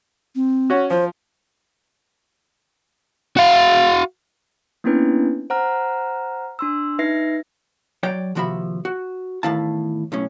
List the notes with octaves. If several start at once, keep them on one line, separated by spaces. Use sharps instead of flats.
C4
C#4 F#4
F3 C5
F#4 F5
A#3 B3 C#4 D4 E4 B4
C5 F#5 A#5 F6
D4 C6 E6
D#4 B4 E5 A#6 C7
F#3 C#5 D5 G5
D#2 C3 F3 F#4 E5 B5
F#4
E2 A2 D#3 E4 F5 A5
B1 A2 C#4